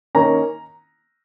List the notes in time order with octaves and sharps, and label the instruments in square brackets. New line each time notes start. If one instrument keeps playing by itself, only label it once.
[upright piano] D#3 A#3 C#4 A#5